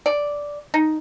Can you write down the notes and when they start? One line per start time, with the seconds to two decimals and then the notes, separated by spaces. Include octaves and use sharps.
0.06 D5
0.74 D#4